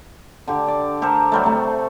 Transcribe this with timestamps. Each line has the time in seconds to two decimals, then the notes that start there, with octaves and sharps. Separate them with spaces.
0.48 D3 G4
0.68 D5
1.02 G4 A4 A#4 C5
1.32 F#3 G3 A3
1.44 C3 A3